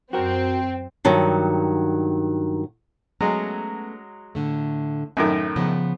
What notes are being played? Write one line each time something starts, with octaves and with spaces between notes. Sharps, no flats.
F#2 C4 F#4 A#4 G5
G2 D#3 F#3
F#3 G#3 A3 B3 C#4
A2 D3 A3
F#2 A2 D#3 E5
C#3 F3 B3